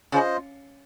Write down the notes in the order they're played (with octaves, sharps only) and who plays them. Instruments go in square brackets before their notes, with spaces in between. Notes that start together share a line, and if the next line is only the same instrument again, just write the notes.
[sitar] C#3 [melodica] F4 C5 D#5